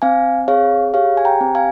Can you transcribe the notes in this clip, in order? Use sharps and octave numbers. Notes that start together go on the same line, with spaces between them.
C4 F5 G#5
G#4 C#5 F5
G4 C#5 F5
G#5
G5 A#5
C4
F5 G#5